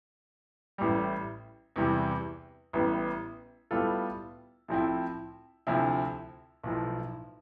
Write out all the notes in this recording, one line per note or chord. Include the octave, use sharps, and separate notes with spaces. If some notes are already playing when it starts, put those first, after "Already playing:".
A1 A2 G3
E2 C3 E3 G3
A1 A2 G3 B3
A2 G3 B3 F4 A4
A2 F3 C4 E4
D2 C3 F3 C4 E4
B1 A2 F3